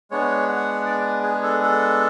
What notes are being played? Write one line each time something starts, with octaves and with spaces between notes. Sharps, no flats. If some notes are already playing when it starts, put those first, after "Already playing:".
G#3 B3 D4 C#5
F#5
D5
G#4
A4
A4